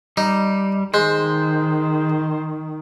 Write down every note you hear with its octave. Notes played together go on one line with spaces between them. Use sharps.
G3 D#4
D#3 G#3 C5